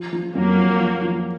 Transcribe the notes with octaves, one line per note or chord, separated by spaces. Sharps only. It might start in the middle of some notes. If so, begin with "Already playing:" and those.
Already playing: F3
F3
F2 F#3 A#3
F3
F3
F3